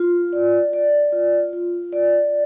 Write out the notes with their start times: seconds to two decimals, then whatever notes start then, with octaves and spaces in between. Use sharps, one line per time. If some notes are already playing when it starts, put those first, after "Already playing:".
Already playing: F4
0.33 D5
0.73 D5
1.13 F4
1.53 F4
1.93 D5